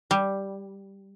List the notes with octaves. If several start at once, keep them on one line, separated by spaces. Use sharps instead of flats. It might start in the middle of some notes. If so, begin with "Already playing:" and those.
G3